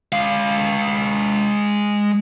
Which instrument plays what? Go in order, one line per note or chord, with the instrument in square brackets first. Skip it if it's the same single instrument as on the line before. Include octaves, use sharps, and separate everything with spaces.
[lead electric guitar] G#3 F5